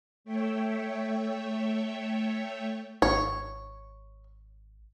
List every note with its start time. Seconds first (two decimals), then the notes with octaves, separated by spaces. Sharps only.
0.24 A3 C#5 E5 G5
3.02 G#1 C#5